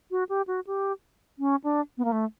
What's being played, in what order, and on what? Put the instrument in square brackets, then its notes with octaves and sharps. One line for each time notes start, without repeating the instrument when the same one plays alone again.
[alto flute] F#4
G4
F#4
G4
C#4
D4
B3
A#3
A3